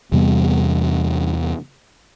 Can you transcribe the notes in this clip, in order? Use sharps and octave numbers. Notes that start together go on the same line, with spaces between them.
E2 C3 G3 B3